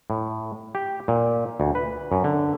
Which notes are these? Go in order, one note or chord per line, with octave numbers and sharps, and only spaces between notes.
A2
G4
A#2
D2
B4
F#2
D3